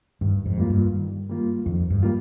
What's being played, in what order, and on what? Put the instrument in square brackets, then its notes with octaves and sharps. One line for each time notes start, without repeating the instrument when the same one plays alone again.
[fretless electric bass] G2 [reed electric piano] D#3
[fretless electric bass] F2 G#2
[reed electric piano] G3 A#3 F4
[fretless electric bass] G2
[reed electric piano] D#3
G3 A#3 F4
[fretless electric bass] F2 [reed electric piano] D#3
[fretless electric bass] G2
[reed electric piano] G3 A#3 F4